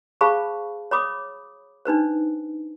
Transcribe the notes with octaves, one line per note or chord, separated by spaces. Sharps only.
G#4 C5 F5 A5 B5 C#6
C#5 B5 D6 D#6
D4 D#4 B4 C5